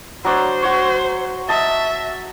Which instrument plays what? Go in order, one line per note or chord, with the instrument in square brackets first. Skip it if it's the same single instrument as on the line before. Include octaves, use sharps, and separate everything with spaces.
[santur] F#3 D4 C#5 [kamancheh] C5
[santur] F#4 C#5
[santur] D#5 A5 [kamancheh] E5